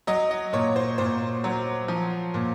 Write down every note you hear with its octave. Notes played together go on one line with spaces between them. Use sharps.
F#3 D#5
D#5
A#2 C#5
C5
A#2 C5
F#3
F3
A#2